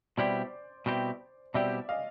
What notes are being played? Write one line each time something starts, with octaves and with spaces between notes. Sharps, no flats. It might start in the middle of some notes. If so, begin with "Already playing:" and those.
B2 G3 C4 E4 G4 C5 D5
B2 G3 C4 E4 G4
B2 G3 C4 E4 G4 D5 E5
D#5 F5